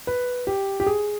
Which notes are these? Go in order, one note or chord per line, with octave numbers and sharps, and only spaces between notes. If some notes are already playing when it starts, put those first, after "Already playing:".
B4
G4
G4
G#4